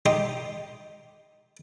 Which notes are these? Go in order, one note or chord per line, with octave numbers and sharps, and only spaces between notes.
D#4 G4 D#5 C6